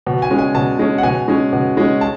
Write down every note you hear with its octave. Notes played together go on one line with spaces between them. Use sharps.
B2
G#5
G#3 C#4
G#5
B2 A5
G#3 C#4
F#5
B2 G#5
G#3 C#4
B2
G#3 C#4
A5